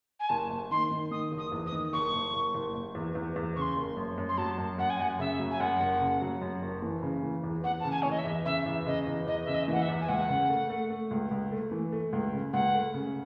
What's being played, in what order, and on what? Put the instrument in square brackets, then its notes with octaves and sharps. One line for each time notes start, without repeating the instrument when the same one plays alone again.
[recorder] G#5
[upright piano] F#1 [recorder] A5
[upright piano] F#1
[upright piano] D#3 [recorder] C6
[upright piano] D#3
[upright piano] D#3 [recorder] D#6
[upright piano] F#1
[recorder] D#6
[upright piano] E2
[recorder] D#6
[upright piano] D#3
[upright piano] F#1 [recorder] C#6
[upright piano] F#1
F#1
F#1
F#1
E2
E2
E2
[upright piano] C#3 [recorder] C6 C#6
[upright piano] F#1
F#2
F#2
[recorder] C6
[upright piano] F#3 [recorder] A5
[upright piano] F#2
[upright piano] F#2 [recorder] F#5
[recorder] G#5
[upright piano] F#2 [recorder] F#5
[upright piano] C#3 [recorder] E5
[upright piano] F#3
[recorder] G#5
[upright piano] F#2 [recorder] F#5
[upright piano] F#1
C#3
F#3
F#2
F#1
E3
C#3
E3
E2
[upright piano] E2 [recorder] F#5
[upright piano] C#3 [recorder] A5
[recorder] G#5
[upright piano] E3 [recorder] C#5
[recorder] D#5
E5
[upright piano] E2
[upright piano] C#3 [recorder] E5
[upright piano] E2
[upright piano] C#3 [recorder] D#5
[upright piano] E2
[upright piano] E2 [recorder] D#5
[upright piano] C#3 [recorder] E5
[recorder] D#5
[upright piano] E3 [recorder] F#5
[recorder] E5
[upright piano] E2
[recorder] G#5
[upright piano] C#2 [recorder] F#5
[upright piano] C#3
A3
A3
A3
C#2
C#2
A3
E3
A3
C#2
C#3
[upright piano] C#2 [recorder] F#5
[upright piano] A3
C#3